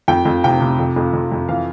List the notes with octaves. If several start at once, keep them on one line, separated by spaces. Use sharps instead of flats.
F2 G5
F2
C3 G5
C3
F2
F2
F2
F2
E3 F5